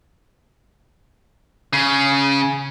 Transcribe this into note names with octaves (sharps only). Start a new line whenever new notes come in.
C#3